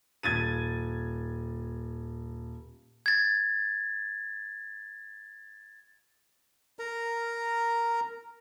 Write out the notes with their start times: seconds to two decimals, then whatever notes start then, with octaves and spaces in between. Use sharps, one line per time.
0.23 D#1 G#6 A6 D#7
3.06 G#6 A6
6.79 A#4 A#5